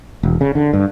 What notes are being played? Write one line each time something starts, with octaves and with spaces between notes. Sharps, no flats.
E1
C#3
D3
G2